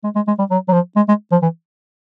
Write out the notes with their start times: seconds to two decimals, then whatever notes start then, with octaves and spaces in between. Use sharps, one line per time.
0.04 G#3
0.15 G#3
0.27 G#3
0.39 G3
0.51 F#3
0.68 F#3
0.72 F3
0.96 G#3
1.08 G#3
1.32 F3
1.42 E3